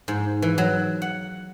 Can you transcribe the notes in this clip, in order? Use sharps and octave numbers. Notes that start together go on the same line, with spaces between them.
G#2
E3
F#3
F#5